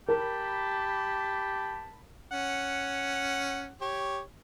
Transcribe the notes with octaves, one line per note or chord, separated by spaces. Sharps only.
G4 A#4 A5 B5
C#4 F#5
G4 C#5